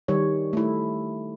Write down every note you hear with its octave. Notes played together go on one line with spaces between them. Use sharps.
D#3 G3 C#5
A3 E4